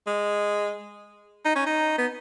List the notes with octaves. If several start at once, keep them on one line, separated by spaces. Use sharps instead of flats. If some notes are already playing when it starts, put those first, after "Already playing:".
G#3
D#4
C#4
D#4
B3